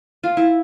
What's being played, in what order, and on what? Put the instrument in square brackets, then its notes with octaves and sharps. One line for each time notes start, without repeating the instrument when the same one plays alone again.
[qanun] F4
E4